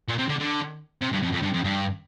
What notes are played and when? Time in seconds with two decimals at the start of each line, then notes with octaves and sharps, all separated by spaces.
0.09 A#2
0.18 C3
0.29 D3
0.40 D3
1.02 C3
1.13 G2
1.22 F2
1.33 F2
1.43 G2
1.54 F2
1.64 G2